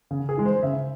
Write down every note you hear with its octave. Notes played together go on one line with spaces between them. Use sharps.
C#3
G#4
E3 G#3
C5
C#3 E5